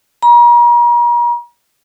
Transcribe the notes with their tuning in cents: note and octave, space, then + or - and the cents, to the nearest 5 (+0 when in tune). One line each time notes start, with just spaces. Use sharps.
A#5 +40